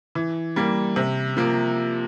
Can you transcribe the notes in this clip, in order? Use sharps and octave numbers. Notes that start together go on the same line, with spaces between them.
E3
G3 A#3
C3
F3 A#3